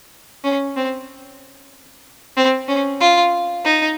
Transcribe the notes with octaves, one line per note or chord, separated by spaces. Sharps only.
C#4
C4
C4
C#4
F4
D#4